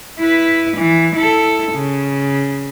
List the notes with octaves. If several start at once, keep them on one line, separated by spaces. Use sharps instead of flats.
E4 B4
E3
E4 A4
C#3